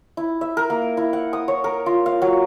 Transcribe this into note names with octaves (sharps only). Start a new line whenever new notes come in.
E4
E5
A#4
A#3
E4
F#5
D#6
C#5
A#4
F4
F5
F#3